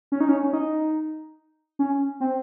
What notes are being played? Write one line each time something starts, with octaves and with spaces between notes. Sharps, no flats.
C#4
D#4
C#4
C#4
D#4
C#4
C4